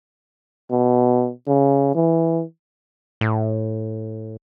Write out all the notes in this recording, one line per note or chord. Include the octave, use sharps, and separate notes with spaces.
B2
C#3
E3
A2